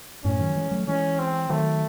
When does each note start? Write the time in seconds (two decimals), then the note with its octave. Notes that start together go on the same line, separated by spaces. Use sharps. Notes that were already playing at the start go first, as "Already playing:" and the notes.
0.24 F#2 A2 C#4
0.40 D#3 F#3
0.56 E3 G#3
0.71 F#3 A3
0.87 E3 G#3 C#4
1.19 C4
1.50 D#3 F#3 A3